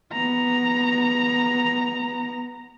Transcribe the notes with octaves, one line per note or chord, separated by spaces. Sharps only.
B3 A#5